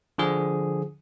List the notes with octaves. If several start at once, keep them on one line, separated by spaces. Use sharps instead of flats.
D3 F3 G#4